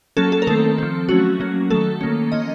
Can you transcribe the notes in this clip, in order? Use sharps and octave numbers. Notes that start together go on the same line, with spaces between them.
F#3 A#3 C#4 A4
A4
A#4
D#3 A3 C4 A4
F3 C4
F#3 A3 C#4 F#4
F#3 A#3 C#4
D#3 F#3 A3 A4
D#3 A#3 C#4
F3 A#3 C#4 D#5